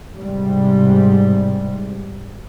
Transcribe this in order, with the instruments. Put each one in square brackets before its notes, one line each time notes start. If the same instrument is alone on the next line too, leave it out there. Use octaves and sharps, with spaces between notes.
[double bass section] G#2 C3 G3